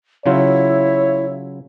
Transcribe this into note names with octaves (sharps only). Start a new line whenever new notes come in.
C#3 F#3 E4 F4 C#5